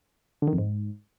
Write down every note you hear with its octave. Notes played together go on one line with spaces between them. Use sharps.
D3
D#3
F2
G#2